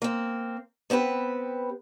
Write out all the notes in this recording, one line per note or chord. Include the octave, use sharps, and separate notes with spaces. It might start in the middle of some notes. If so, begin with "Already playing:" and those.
A#3 C4
B3 C4 G4 B4